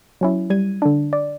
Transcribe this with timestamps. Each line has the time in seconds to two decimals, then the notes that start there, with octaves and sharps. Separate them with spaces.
0.21 F#3 C#4 E4
0.50 G3 G#6 D#7
0.82 D3 D4
1.13 D5